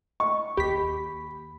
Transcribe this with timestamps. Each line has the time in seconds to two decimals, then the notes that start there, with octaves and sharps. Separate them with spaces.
0.20 D#5 C#6
0.57 D#2 G4 B5 B6